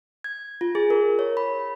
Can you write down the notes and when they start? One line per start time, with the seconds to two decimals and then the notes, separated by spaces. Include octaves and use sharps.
0.24 G#6
0.61 F4
0.75 G#4
0.90 A#4
1.19 C#5
1.37 B5